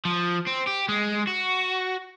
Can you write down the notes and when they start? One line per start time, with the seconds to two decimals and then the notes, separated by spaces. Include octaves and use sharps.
0.05 F3
0.47 C4
0.67 G4
0.89 G#3
1.27 F#4